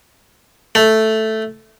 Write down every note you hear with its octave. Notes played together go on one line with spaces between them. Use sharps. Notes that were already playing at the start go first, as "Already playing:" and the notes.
A3